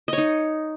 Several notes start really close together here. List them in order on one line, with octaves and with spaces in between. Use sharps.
D#5 C#5 D#4